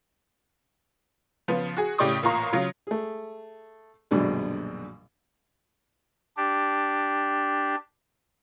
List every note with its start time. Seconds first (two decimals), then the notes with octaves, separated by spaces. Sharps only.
1.48 C#3 F3 B3
1.77 F#4 G#4
1.98 A2 C#3 G4 D5 C#6 D#6
2.23 A1 A#2 F4 A#5 C#6
2.53 C#3 F#3 F4
2.87 A3 G#4
4.11 A#1 F#2 B2 D3 G3 G#3
6.37 D4 G4